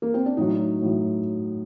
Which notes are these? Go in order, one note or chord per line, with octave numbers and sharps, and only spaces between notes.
A#3
C4
D4
A2 F#3 D#4
A2 F#3